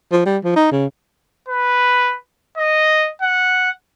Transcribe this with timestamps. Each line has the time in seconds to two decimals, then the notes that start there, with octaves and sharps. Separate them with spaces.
0.12 F3
0.26 G3
0.44 F3
0.56 D#4
0.72 C#3
1.48 B4
2.58 D#5
3.22 F#5